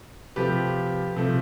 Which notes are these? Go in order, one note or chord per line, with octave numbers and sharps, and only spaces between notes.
C3 F3 A3 G4 B4
C3 F3 A3